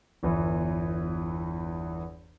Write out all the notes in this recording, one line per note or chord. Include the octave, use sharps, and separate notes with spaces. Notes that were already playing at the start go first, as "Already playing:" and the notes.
G1 E2 E3